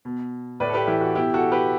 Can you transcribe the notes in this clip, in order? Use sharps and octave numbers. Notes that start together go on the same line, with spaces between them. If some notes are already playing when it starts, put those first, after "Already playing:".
B2
A2 B4 D5
A4
G4 B4
E3 E4 G4
F#4
B2 E4 G4
F#4 A4
G4 B4